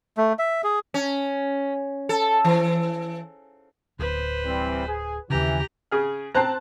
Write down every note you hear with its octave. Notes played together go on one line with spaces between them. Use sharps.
A3
E5
G#4
C#4
A4
E3
D1 B4 C5
E3 G3 C4
G#4
D#2 C#3 E3 G4 A#5
C#3 G#4 F6
C4 C5 A5 A#5 F#6